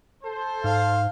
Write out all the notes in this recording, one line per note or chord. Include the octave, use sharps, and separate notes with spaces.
A4 C5
G#2 F5